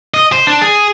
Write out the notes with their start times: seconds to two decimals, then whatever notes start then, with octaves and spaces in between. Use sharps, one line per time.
0.14 D#5
0.32 C5
0.47 D4
0.62 G#4